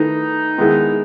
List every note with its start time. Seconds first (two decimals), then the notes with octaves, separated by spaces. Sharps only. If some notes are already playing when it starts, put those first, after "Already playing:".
Already playing: D#3 A3 D#4 E4 B4
0.58 D#3 G#3 B3 E4 G#4